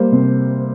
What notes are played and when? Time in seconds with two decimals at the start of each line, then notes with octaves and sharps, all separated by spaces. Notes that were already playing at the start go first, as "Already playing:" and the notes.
Already playing: G3 A#3 C5
0.12 C3